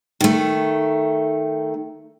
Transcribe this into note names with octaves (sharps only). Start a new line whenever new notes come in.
D#3 A3